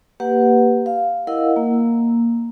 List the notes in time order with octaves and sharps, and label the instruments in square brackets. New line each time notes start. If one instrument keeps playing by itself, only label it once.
[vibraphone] A#3 G4 B4 F#5
F5
E4 A#4 D#5 F5 F#5 E6
A#3